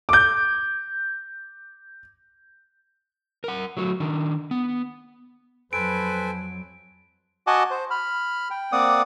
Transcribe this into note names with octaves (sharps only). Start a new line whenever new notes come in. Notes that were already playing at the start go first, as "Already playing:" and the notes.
D6 G6
A#4 F#5
F#3 A3 F#4
D#3 D4
B3
F2 F#3 A4 B4 C5 G#5 D7
F#4 D#5 F#5 G#5 A5 D6
C5
B5 F6
G5
A#3 C4 D5 F#5 D6 D#6